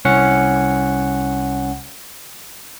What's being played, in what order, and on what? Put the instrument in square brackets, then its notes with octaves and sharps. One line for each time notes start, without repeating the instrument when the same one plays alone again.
[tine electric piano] C2 C#4 F#5